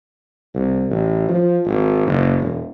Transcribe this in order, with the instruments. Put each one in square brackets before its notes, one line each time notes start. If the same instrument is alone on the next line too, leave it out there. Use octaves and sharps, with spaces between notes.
[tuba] C2
A1
F3
G#1
F#1
E1